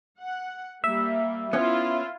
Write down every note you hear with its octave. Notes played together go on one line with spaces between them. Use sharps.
F#5
G3 A#3 E5
B3 C#4 E4 F4